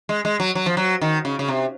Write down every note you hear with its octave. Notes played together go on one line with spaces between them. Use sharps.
G#3
G#3
F#3
F#3
F3
F#3
D#3
C#3
C#3
C3